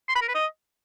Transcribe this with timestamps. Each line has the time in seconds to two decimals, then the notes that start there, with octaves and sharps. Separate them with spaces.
0.09 C6
0.15 B5
0.22 A#4
0.28 B4
0.35 D#5